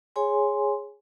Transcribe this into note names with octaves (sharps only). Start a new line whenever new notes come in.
G#4 C#5 G#5 C6